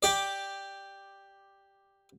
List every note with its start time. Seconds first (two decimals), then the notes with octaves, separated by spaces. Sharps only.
0.03 G4 D5